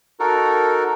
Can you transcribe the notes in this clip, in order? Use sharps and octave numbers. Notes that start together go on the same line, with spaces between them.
D#4 F#4 A4 A#4